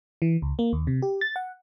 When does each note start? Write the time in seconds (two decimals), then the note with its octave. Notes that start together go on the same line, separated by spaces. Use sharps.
0.22 E3
0.42 C#2
0.59 A#3
0.73 D#2
0.87 C3
1.02 G4
1.21 A6
1.36 F#5